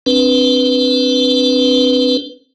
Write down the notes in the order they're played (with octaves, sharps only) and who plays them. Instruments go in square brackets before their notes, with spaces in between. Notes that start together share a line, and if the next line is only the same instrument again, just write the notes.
[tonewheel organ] C4 D4 B4